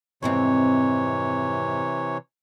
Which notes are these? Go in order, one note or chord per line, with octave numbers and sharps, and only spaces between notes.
F2 G#2 C3 E3 C4 C#5